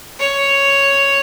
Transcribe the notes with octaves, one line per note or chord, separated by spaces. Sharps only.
C#5